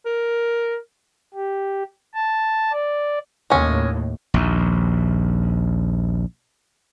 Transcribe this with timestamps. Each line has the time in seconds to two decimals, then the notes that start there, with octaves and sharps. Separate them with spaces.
0.06 A#4
1.34 G4
2.14 A5
2.72 D5
3.50 D#2 A2 G#3 C#4
4.34 A#1 D#2